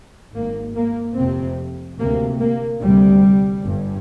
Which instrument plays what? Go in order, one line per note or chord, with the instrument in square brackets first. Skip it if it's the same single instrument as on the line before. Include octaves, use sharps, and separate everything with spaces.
[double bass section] G#1 G#2 A#3
A#3
F1 F2 C3 C4
D2 C3 A#3
A#3
D2 C3 G3
G1 G2